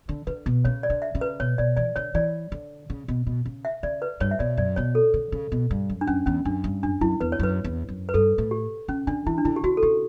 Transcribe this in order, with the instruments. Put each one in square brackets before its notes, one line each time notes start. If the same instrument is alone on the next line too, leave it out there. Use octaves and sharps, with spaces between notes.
[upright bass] D3
[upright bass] D3 [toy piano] B4
[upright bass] B2
[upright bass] C#3 [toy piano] C#5
[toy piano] D5
[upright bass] D3
[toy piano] E5
[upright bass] C#3
[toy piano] B4
[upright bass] B2 [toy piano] C#5
[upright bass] B2 [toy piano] D5
[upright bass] E3 [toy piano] D5
[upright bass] D3 [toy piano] C#5
[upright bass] E3 [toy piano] D5
[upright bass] D3
C#3
B2
B2
C#3
[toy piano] E5
[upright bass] C#3 [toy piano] D5
[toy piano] B4
[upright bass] G2 [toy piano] C#5
[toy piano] E5
[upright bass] B2 [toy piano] D5
[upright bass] F#2 [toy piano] D5
[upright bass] B2 [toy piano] C#5
[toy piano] A4
[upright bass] D3
C#3
B2
G2
F#2
[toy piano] D4
[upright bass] F#2 [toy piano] C#4
[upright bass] E2 [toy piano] C#4
[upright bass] F#2 [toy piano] D4
[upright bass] G2
[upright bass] F#2 [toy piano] D4
[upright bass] F#2 [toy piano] E4
[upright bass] E2 [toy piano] B4
[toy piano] C#5
[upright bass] F#2 [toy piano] B4
[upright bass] E2
F#2
[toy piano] B4
[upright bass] G2 [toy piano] A4
[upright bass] A2
[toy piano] G4
[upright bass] C#3 [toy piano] C#4
[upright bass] D3 [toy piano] D4
[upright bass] E3 [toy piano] E4
[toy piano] D4
[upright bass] D3 [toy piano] E4
[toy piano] G4
[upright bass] D3 [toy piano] F#4
[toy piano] A4
[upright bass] C#3 [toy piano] G4